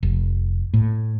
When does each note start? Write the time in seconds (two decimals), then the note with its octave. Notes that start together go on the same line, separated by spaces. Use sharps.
0.03 F1
0.74 A2